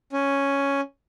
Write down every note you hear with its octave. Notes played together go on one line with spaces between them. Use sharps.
C#4